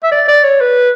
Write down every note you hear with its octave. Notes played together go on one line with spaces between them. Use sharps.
E5
D5
D5
C#5
B4